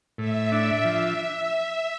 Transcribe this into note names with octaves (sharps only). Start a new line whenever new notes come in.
A2 E5
D4
F3